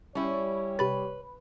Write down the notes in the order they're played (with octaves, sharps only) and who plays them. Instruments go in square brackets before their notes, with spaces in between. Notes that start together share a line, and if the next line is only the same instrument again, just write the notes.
[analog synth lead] G3 [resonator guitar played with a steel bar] C#4 E4 [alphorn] C#5
[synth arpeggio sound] C3 B5 A6 [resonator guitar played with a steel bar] B4